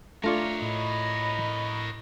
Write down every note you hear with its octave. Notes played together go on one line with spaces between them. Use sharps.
A3 D4 F4 A#4 C#5 D5
A2 D#5 B5